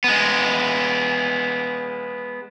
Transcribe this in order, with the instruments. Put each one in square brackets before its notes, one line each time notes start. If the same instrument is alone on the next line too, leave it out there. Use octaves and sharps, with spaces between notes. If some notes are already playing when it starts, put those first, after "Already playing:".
[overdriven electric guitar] G#3 B3